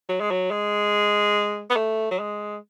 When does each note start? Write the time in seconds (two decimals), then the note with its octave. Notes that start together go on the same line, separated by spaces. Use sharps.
0.09 F#3
0.20 G#3
0.31 F#3
0.51 G#3
1.70 B3
1.76 A3
2.11 F#3
2.19 G#3